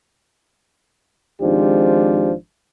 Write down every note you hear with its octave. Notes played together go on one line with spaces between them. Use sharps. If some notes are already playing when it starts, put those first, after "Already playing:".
G#1 G#2 F3 D4 G4